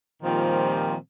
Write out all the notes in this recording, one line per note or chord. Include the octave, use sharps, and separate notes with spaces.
A#2 D#3 F3 G3 C4 G4